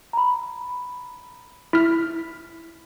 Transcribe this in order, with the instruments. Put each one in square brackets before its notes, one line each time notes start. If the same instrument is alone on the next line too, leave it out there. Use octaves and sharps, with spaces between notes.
[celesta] A#5 B5
[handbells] E4 F6 [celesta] B6